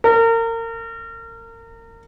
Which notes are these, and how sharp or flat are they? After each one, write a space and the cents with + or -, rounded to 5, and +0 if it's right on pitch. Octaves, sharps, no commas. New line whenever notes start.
A#4 -30